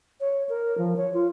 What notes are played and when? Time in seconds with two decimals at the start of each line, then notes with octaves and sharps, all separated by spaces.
0.20 C#5
0.49 A#4
0.78 F3
0.97 C#5
1.14 F4